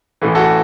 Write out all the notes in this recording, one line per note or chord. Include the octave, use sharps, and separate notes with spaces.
A1 A2 E3
F#4 A4